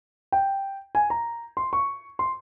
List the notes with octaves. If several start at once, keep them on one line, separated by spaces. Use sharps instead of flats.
G5
G#5
A#5
C6
C#6
C6